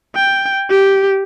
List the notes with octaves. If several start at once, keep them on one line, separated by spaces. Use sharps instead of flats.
G5
G4